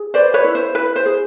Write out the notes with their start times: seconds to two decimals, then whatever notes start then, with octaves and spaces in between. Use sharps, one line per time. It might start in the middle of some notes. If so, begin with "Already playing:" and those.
Already playing: G#4
0.14 B4 C5 D5
0.34 B4 C#5
0.44 E4
0.55 C5
0.75 E4 B4
0.96 C5
1.06 G#4